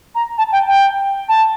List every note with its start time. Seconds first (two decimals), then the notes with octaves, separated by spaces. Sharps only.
0.15 A#5
0.38 A5
0.52 G5
0.68 G5
1.29 A5